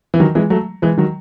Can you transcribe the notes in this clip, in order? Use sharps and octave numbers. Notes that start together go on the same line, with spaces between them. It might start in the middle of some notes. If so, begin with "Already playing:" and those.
E3
D#3 F#3
E3 G#3
F#3 A3
E3 G#3
D#3 F#3